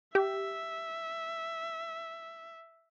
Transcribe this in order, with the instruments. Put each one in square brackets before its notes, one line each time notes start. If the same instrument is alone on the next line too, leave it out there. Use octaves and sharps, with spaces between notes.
[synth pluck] G4 [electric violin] E5